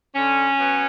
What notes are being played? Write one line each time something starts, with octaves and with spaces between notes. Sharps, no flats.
D3 C#4
F#3 B3